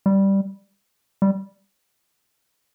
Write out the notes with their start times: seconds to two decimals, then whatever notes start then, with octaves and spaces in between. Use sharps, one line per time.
0.06 G3
1.22 G3